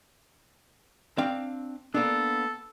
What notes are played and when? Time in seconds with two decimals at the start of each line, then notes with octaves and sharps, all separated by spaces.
1.18 C4 D4 F5
1.94 A#3 B3 D4 A4